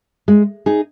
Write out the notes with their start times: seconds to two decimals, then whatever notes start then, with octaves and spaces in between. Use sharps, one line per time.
0.28 G#3
0.66 D#4 G#4